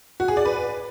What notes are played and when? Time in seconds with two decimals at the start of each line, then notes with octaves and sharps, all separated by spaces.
0.20 F#4
0.28 G#4
0.37 D5
0.45 B4